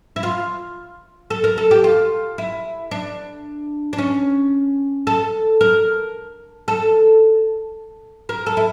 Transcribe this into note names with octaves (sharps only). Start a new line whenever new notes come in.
E4
F4
A4
A#4
A4
G4
F4
E4
D4
D4
C#4
A4
A#4
A4
A#4
A4
E4